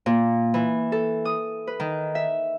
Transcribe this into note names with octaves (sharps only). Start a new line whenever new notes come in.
A#2
E3
A4
D#6
B4
D#3
E5